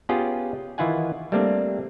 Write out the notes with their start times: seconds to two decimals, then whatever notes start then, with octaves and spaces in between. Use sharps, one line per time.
0.09 B3 C#4 F4 G4 G#4 G5
0.78 D#3 E3 E4 F4 F#5 G#5
1.32 G3 A3 A#3 C4 D4